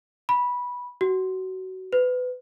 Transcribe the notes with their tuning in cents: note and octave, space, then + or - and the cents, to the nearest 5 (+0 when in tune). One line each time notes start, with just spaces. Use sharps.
B5 -10
F#4 +20
B4 +25